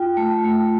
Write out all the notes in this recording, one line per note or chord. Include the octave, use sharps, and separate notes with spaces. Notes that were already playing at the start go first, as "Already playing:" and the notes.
Already playing: F4 G5
A3
A3